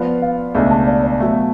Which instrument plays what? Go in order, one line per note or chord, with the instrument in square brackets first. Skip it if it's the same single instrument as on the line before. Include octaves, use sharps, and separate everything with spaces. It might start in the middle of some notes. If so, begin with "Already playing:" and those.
Already playing: [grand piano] F3 B3 F4 [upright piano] D5
[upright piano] F5
[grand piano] C#2 B2 A3 D4 [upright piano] G#5
[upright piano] A5
D5
D5
[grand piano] B2 F#3 A3